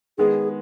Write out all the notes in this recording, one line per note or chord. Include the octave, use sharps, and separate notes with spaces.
D#3 G#3 B3 G#4